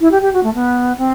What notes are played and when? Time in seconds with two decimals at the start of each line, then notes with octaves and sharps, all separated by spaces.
0.01 E4
0.11 G4
0.22 G4
0.33 F#4
0.43 A3
0.54 B3
0.98 C4